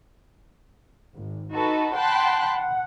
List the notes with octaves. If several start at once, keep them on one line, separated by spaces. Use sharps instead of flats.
G#1
D#4 F#4 A4 B4
F#5 G5 A5 B5 C6 F#6
F#5